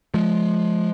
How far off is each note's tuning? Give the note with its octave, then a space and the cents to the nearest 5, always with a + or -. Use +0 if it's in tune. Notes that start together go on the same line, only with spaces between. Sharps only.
F3 +0 G#3 +30